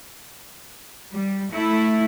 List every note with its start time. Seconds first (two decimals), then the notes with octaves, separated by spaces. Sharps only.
1.11 G3
1.51 A3 E4